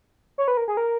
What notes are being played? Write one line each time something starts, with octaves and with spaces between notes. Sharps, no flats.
C#5
B4
A#4
G#4
A#4